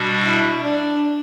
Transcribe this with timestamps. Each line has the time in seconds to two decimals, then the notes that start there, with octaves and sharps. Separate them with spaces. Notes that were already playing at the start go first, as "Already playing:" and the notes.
Already playing: B2 G3 D4 F#4
0.24 E4
0.63 D4